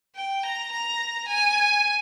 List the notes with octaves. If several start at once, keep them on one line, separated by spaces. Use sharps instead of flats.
G5
A#5
A#5
G#5